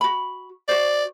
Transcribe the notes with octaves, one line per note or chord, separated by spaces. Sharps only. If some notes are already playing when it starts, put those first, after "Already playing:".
F#4 B5
F#4 C5 D5